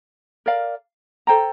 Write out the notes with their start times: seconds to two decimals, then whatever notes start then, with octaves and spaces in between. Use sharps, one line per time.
0.46 A#4 D5 F5
1.27 A4 C5 G5 A#5